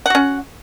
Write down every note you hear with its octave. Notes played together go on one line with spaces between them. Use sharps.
C#4 F#4 F#5